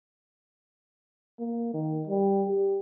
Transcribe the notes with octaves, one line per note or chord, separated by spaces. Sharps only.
A#3
D#3
G3
G4